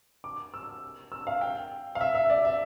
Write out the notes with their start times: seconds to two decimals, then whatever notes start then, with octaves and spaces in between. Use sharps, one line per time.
0.24 D6
0.54 E6
1.12 E6
1.27 F5
1.41 G5
1.95 F5
2.01 E5
2.15 E5
2.30 D5
2.45 E5